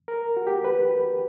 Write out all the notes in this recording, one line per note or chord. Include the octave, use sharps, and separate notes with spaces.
A#4
F#4
G4
B4